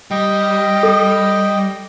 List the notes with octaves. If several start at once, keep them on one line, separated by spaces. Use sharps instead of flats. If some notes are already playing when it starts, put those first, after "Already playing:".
G3 D#5 G5
A4